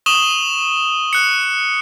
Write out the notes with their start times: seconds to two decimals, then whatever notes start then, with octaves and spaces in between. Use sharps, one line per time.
0.06 C#6 D#6 E7 F#7 G7
1.13 F#6 C#7